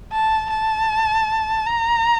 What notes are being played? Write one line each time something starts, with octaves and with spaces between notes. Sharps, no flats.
A5
A5
A#5